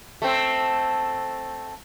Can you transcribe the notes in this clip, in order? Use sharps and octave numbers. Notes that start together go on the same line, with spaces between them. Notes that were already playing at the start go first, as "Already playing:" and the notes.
A3 C4